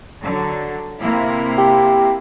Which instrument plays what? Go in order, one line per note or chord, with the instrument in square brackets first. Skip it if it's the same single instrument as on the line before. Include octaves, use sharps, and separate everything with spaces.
[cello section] D3 F#3
C3 A#3 E4
[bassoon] G4